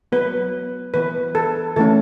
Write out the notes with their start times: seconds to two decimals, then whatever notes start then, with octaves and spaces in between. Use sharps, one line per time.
0.12 F#3 B3 B4
0.94 E3 B3 B4
1.35 A4
1.76 E3 A3 C#4 A4